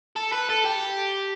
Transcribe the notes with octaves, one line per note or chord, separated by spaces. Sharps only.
A4
B4
A4
G4